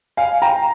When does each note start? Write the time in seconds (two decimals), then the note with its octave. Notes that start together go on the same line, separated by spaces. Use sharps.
0.17 F5 G#5
0.42 G5 A#5